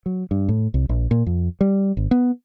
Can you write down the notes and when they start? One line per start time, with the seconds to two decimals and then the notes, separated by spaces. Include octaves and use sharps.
0.06 F#3
0.31 G2
0.49 A2
0.74 C2
0.89 A#1
1.11 A#2
1.27 F2
1.61 G3
1.97 G#1
2.11 B3